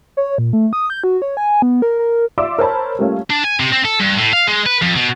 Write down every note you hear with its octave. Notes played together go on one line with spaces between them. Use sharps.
C#5
A#2
A3
D#6
G6
F#4
C#5
G#5
B3
A#4
A#4
F4 D5 E5 C6 D6 E6
A#4 C5 C#5 A5 B5
G3 A3 A#3 C#4 F4
D4
G#5
C3
C4
A4
G2
A2
F5
G#3
B4
F2
B2